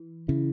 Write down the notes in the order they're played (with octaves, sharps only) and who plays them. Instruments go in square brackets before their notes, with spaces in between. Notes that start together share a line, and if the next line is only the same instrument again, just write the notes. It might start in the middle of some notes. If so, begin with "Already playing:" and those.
Already playing: [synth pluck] E3
[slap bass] C#3 [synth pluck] E4